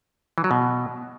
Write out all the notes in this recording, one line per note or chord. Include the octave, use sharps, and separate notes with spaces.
E3
F#3
B2